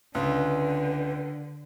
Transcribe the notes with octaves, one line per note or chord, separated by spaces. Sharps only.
C#2 D3 B4